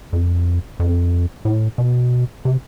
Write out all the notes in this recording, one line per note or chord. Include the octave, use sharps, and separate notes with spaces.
F2
F2
A2
B2
C3